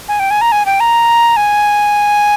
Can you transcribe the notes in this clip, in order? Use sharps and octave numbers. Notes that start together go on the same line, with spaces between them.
G#5
G5
G#5
A#5
G#5
G5
A#5
G#5